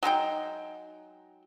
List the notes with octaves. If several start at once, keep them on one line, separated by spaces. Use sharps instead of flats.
F#3 G#3 D#4 G5